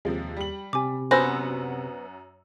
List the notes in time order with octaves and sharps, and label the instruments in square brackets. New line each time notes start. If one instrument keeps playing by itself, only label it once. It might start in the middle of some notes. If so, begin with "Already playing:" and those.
[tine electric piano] D#2 [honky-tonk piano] C3 F3 G#3
[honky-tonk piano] G3 F#7
[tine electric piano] C3 C4 G4 [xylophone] G#5 D6
[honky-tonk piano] F#2 F#4 E6 [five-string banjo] B3 C5 [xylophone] G#5 B5 A#6